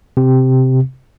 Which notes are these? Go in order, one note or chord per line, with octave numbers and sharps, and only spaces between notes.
C3